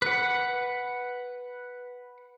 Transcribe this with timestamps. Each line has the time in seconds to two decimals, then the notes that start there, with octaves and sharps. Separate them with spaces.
0.02 B4 F#5